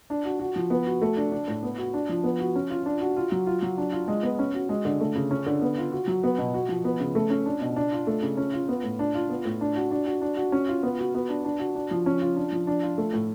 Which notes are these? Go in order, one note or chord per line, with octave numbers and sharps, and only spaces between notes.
D4
F#4
F#4
F3
B3
F#4
A3
D4
D4
A2
B3
F#4
D4
F3
B3
F#4
C#4
F4
D4
F#4
F4
F#3
F4
F#3
D4
F4
G#3
B3
C#4
F#4
G#3
D3
A3
C#3
C#4
D3
B3
F4
F#4
F#3
B3
B2
F#4
F3
B3
C#3
A3
C#4
D4
B2
D4
F4
A3
C#3
C#4
F4
B3
A2
D4
F4
B3
A2
D4
F#4
D4
F#4
D4
F#4
C#4
F4
B3
F#4
B3
D4
D4
F#4
D4
F3
C#4
F4
D4
F3
D4
F4
A3
A2